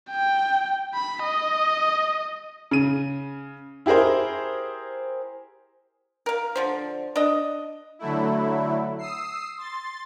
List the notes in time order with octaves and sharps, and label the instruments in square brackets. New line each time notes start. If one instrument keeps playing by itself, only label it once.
[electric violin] G5
B5
D#5
[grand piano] C#3 D#7
E4 G4 G#4 A#4 C5
[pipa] A#4 F5
D3 F3 C5
D4 D#5
[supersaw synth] D3 F#3 A3 E4
D#6 E6 C7
C6 A6